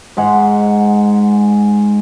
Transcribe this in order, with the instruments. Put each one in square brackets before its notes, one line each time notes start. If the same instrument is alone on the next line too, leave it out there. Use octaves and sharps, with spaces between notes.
[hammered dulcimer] G#2 G#3 F#5